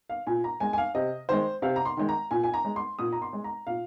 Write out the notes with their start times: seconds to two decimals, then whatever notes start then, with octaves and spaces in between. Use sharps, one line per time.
0.10 F5
0.27 A#2 G#5
0.44 A#5
0.60 G#3 G#5
0.73 G#5
0.78 F5
0.95 C3 D#5
1.29 D#3 G#3 C5
1.62 C3 F5
1.76 A#5
1.85 C6
1.97 D#3 G#3
2.09 A#5
2.31 A#2 G#5
2.44 G#5
2.54 A#5
2.65 G#3
2.76 C6
2.99 A#2 D#6
3.13 A#5
3.22 C6
3.33 G#3
3.44 A#5
3.67 A#2 F5